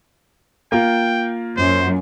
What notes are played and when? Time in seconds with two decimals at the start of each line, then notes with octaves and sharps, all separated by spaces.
0.72 A#3 F4 G5
1.57 F#2 C5